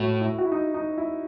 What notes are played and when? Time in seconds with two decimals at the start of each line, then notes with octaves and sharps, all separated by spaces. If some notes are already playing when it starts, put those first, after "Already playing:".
Already playing: A2 A3 F#4
0.21 E4
0.38 F#4
0.45 E4
0.52 D#4
0.74 D#4
0.98 E4